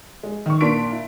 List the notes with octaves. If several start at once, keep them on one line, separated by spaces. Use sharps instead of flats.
G#3
D#3 C#6
A#2 D4 A#4 C6 B6 D7
E4